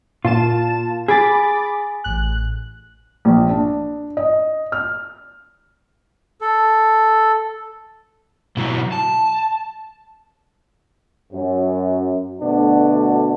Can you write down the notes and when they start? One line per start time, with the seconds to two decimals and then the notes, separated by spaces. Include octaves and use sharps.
0.25 A#2 F4 A5 E7
1.08 G#4 B5 D6 A6
2.04 A1 F#6
3.25 A#1
3.49 D4
4.17 D#5
4.72 F6
6.41 A4
8.57 B2 F#3 E4 F#4 A#5
8.92 A5
11.33 F#2
12.42 D2 B2 A3 D4 F#4